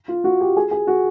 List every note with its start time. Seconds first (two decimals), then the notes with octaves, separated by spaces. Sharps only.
0.08 F4
0.24 F#4
0.41 G4
0.57 G#4
0.71 G#4
0.87 F#4